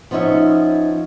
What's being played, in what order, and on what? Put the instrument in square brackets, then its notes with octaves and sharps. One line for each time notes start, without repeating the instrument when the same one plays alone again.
[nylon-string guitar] F3 B3 C#4 D#4 E5